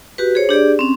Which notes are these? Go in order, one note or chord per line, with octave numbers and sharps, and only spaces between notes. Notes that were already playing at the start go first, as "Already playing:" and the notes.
F#4 G4 B4
G#4 C5 C#5
D4 G4 G#4 D5
C4 C#4